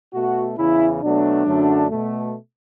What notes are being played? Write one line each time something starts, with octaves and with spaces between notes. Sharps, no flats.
B2 A3 F#4
E2 C#3 E3 E4
B2 F#3 A3 D4
F#2 D3 F#3 A3
B2 A3